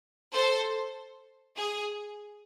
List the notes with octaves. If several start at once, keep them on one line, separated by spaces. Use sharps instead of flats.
A4 C5
G#4